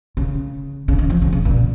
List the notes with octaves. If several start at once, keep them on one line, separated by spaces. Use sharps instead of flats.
C#3
C#3
D#3
F3
C#3
C#3
A#2